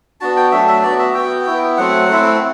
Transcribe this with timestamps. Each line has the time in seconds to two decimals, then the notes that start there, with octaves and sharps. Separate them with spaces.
0.21 B3 D4 F#4 A5
0.36 G5
0.52 F#3 A3 D4 E5
0.68 E5
0.83 B3 F#4 D5
0.99 E5
1.14 B3 F#4 G5
1.47 B3 E4
1.77 F#3 A3 C4 F#5
2.09 A3 C4 E4